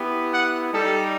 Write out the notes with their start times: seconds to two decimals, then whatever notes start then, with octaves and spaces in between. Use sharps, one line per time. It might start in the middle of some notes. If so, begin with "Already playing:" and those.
Already playing: B3 E4 G4
0.32 F#5
0.71 G3 D#4 G4 A4